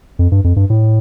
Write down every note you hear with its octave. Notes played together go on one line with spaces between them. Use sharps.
F2
G2
F2
G2
A2